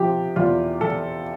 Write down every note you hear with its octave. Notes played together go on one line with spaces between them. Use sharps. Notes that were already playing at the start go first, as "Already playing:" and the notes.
Already playing: C3 F3 G4
E2 F4
E2 A4